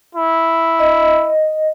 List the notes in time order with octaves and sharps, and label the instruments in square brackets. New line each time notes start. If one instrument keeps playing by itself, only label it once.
[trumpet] E4
[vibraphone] D#5